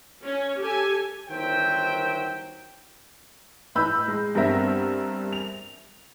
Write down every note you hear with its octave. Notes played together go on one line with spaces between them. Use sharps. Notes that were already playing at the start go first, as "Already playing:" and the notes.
C#4
G4 A4 G#5
G1 D#3 F#3 C5 E5 G5
A2 D#4 B4 B5 E6 G6
G#3
G2 B3 C4 A#4 E5 A#6
F7